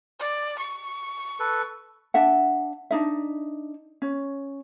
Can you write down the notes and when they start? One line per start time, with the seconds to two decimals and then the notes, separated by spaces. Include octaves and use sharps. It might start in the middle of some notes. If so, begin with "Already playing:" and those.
0.19 D5
0.59 C#6
1.40 A4 B4
2.14 D4 E5 F#5
2.91 D4 D#4 E5
4.02 C#4